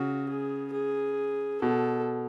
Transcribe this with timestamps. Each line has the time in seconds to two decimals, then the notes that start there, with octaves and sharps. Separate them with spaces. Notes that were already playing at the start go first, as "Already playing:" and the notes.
Already playing: C#3 F#4
0.29 G#4
0.73 G#4
1.61 B2 A4